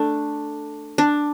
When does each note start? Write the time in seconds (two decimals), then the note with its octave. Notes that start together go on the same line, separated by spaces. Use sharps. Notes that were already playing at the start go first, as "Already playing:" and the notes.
Already playing: A3 D4
0.98 D4